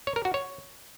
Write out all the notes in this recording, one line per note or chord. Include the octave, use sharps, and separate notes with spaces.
C#5
A#4
F#4
C#5